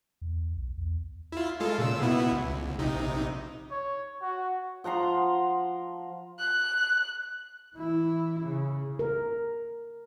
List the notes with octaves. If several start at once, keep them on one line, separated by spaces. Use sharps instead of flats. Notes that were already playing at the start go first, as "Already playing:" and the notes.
E2
B1
E2
E4 F4
G#3 F4 A4
A#2 C#3 E6
B2 B3 E4
C#2
A#1 C3 D#4
C#5
F#4
F3 F#5 A#5 C6
F#6
E3 E4
C#3
A#4